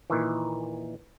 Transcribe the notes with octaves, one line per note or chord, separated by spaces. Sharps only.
A#2 D#3 E3